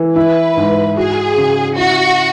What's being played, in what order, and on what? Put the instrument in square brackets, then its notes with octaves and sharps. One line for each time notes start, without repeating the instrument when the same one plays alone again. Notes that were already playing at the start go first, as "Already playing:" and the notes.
Already playing: [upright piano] E3
[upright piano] E4 [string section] B4
[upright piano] G#2
[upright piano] F#4 [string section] G#4
[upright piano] C#3
[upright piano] E4 [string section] F#4